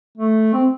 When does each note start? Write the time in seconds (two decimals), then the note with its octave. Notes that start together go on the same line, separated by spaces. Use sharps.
0.17 A3
0.53 C4